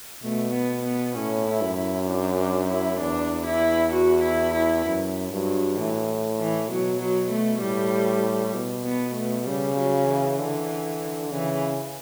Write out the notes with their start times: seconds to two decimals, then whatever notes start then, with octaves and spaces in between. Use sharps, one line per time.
0.23 B2 A3
0.54 B3
0.85 B3
1.16 A2 C#4
1.47 E4
1.62 F#2
1.77 E4
2.08 D4
2.39 D4
2.69 E4
3.00 E2 D4
3.46 E4
3.93 F#4
4.24 E4
4.54 E4
4.85 F#2
5.31 G2 F#3
5.77 A2 E3
6.39 E3
6.69 B2 F#3
7.01 F#3
7.31 A3
7.61 A2 G3
8.54 B2
8.85 B3
9.16 A3
9.47 C#3 G3
9.77 F#3
10.08 E3
10.39 D3
11.31 C#3 E3